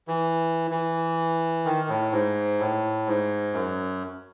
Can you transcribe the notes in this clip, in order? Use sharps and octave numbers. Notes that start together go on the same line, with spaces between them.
E3
E3
D#3
A2
G#2
A2
G#2
F#2